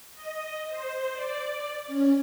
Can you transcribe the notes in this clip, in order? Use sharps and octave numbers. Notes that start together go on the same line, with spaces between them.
D#5
C5
D5
C#4